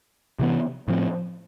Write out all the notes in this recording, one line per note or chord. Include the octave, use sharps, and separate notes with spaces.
C3 E3 B3
A2 F3 C4